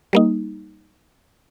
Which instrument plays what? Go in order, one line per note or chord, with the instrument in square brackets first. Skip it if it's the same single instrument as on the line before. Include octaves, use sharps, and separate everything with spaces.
[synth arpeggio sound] G3 A#3 D#4